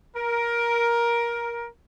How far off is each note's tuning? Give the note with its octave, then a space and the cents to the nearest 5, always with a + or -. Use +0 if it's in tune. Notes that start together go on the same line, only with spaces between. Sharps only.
A#4 +15